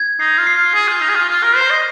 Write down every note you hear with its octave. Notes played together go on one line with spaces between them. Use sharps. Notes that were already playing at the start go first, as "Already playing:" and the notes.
Already playing: G#6
D#4 C7
F4
C7
F4
G#4 G#6
F4
D#4 F7
G#4
F4
F4 F6
A#4
C5 C7
D#5